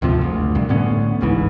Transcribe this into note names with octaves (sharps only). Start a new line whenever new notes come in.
D2 G#2 C3 F3
F#1 D2
C2 G2
A2 D3 B3 C#4
G1 C#2 G#2 E3